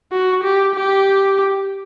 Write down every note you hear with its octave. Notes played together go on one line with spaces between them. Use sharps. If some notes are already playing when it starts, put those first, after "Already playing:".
F#4
G4
G4